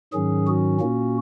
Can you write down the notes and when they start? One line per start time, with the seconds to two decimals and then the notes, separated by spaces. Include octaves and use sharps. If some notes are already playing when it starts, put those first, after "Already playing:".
0.13 G#2 D#3 F#3 C#4 G#4
0.47 F#4
0.80 A#2 A#3 C#4